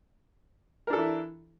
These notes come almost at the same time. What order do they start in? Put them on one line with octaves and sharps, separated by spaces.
A#4 D4 A4 E3 E4